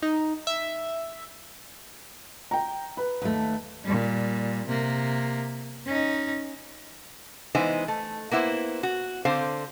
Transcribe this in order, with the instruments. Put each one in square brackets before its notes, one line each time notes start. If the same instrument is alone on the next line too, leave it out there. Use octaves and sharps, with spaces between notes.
[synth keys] D#4
E5
[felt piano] G5 A#5
B4
[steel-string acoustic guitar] D#2 A3
[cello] A#2 G3
C3 A#3
C#4 D#4
[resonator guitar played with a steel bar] E3 G#3 B3 D#4 C5
A3
A#3 B3 E4 C5
F#4
D3 C4 C5 F5